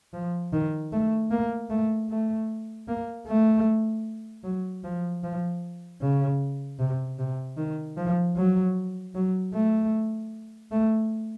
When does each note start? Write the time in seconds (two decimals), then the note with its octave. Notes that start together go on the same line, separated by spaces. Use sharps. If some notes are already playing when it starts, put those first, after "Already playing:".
0.14 F3
0.53 D#3
0.93 A3
1.31 A#3
1.70 A3
2.10 A3
2.88 A#3
3.27 A3
4.44 F#3
4.84 F3
5.24 F3
6.02 C#3
6.79 C3
7.19 C3
7.58 D#3
7.98 F3
8.37 F#3
9.15 F#3
9.54 A3
10.72 A3